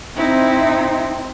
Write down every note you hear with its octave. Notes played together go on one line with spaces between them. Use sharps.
C4 D#4 E4